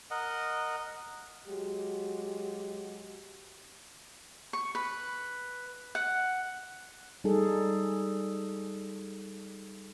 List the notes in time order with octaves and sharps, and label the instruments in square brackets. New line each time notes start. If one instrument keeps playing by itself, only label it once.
[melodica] A#4 D#5 F#5
[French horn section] F#3 G#3 F#4 G4
[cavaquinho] C#6
B4
F#5
[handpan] G3 D#4 G#4 A4